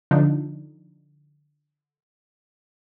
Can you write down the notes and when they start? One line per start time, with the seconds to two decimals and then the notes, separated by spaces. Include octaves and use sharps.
0.11 D3 F3 D4 D#4